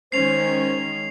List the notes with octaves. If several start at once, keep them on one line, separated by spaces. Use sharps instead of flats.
D#3 G#3 C#4 C5 C7 F7